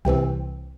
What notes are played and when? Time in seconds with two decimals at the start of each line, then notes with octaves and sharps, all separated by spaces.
0.05 C2 C3 E3 C4 G5